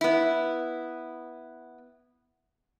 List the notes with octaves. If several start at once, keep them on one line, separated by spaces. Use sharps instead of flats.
B3 E4